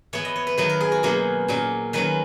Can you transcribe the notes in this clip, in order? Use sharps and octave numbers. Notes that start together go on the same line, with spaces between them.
E3 B3 C#5
D#5
C#5
B4
D#3 F#3 B3 B4
A#4
G#4
F#4
B2 F#3 A#3 C#4 G#4
A#2 F#3 C#4
D#3 F#3 C#4 B4